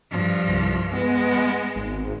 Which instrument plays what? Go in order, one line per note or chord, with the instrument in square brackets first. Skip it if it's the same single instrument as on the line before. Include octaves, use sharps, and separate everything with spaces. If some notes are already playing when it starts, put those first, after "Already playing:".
[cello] G2 F3
[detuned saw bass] C2
[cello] G#3 [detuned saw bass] B3
[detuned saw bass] G#1